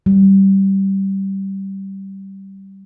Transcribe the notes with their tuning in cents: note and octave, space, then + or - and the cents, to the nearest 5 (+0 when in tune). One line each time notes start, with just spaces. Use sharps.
G3 -15